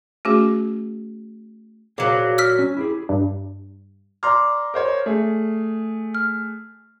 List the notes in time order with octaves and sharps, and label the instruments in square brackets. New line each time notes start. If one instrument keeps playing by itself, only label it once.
[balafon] A3 C#4 F#4 G#4
[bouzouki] A#2 F#3 [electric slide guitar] G#4 C5 F5
[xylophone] E6 F6 B6
[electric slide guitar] C#4
E4 G4 G#4
[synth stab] G2
[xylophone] D5 D6 [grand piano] A#5 C6 F6
[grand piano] A#4 C5 C#5
A3 G#4
[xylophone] F6